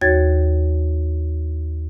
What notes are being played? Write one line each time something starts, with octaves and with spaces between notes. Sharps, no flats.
D#2 F#4 C#5 G#6 A6